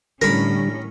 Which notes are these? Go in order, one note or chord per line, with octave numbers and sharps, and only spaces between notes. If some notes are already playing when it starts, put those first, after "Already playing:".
A2 D3 G3 C#4 A#4 B5